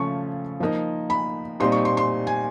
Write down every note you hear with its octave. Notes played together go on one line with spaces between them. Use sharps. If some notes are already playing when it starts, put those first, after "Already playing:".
Already playing: C#3 F3 A3 C#4 C#6
F3 A#3 D#4
B5
A#2 G3 C4 D#4 C6
C#6
C6
C6
G#5